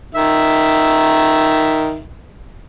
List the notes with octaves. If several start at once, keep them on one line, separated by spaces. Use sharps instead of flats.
D#3 E5